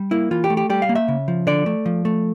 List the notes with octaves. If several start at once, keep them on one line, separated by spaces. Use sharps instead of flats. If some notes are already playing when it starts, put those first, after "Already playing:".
Already playing: G3
A#3 E4
E3 F4
G4
A3
G4
G3 G4
F5
A#3
E5
C#3
F3
D3 D5
A3
F3
A3